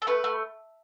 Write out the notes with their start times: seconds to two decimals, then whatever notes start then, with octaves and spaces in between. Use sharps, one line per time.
0.02 A4
0.07 A3 B4
0.24 A3